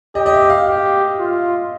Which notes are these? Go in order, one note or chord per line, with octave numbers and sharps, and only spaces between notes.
G4 D#5
D#5
E5
F5
G4 F5
F4